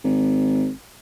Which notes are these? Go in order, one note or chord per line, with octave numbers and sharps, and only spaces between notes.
G#1